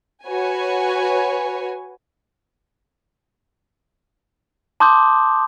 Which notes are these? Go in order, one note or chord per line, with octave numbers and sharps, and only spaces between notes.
F#4 B4 C#5 G#5
A5 C6 D6 D#6 G6